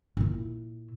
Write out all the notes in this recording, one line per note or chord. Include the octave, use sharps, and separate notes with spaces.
A#2 E4